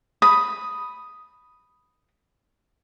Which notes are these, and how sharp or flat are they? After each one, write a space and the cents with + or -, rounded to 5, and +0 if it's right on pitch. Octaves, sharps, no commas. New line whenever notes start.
B5 +0 D#6 +0